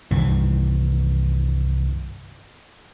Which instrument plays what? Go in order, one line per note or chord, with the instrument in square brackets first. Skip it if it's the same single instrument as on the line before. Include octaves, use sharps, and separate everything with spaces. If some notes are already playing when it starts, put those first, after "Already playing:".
[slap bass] C2 G2 D#3 E3